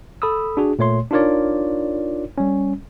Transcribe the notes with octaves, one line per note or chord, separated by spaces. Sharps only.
A4 B5 D#6 E6
D4 F#4 G#4
A#2 A3 C#5 C6
D4 D#4 F4 A#4 C#5 D5
G3 C#4